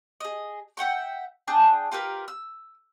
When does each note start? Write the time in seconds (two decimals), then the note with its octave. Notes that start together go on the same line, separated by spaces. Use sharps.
0.20 G#4 D#5
0.77 E5 F#5 G5 C#6
1.47 D4 G#4 G5 A5
1.92 F4 G4 A#4 B4
2.28 E6